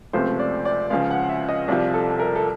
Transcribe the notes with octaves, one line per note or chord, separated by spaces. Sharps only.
C#2 C3 F3 A3 C5
D5
D5
C#2 C#3 F3 F5
F#5
E5
D#5
C2 C3 F3 D5
A4
A#4
A4